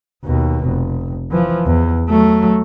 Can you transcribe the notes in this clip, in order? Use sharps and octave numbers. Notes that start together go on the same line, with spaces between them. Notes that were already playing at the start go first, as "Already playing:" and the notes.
D#2 B2
F1
E3 F3
E2
F#3 A3